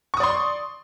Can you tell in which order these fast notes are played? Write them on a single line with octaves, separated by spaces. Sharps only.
C#6 D#6 D5 C6